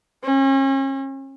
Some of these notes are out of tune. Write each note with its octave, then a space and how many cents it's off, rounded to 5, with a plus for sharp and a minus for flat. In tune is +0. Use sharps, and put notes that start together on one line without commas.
C#4 -40